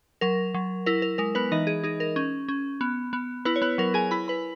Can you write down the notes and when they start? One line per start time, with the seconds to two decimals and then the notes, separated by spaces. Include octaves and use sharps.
0.21 F#3 A#4
0.54 F#3
0.86 E4 A#4
1.02 A#4
1.18 G#3 A#4
1.35 B3 B4
1.52 E3 D#4 D#5
1.67 G#4
1.84 D#4 G#4
2.00 A#4
2.16 C#4
2.49 C#4
2.81 B3
3.13 B3
3.45 B3 E4 B4
3.56 C#5
3.62 B3 B4
3.78 F#3 A#4
3.94 G#4 G#5
4.11 E4 B5
4.28 B4 B5